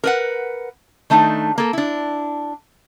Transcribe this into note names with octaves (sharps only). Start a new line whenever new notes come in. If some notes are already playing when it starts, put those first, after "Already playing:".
A#4 B4 F#5
D#3 A3 D4 D#4
A#3 A4
D4 E4